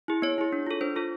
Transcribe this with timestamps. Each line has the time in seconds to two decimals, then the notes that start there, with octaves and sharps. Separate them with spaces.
0.08 E4 G#4
0.22 B3 C#5
0.38 E4 G#4
0.52 D4
0.67 F4 A4
0.81 D4 C5
0.96 F4 A4